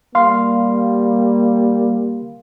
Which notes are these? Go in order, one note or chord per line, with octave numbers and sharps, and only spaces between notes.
G3 A#3 F5 C6